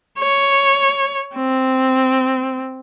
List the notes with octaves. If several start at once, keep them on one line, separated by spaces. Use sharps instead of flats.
C#5
C4